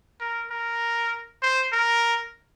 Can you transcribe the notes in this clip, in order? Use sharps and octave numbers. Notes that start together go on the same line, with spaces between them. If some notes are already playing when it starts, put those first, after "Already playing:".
A#4
A#4
C5
A#4